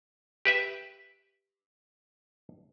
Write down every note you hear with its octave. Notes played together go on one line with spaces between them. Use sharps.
G4 B4 E5